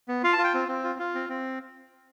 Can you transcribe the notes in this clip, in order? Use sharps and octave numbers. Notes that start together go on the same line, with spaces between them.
B3
F4 F5
A5
F4
G5
C4
C4
F4
F4
C4
C4